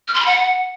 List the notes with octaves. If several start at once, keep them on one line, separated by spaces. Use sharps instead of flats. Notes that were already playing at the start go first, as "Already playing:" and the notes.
F6
C6
B5
F#5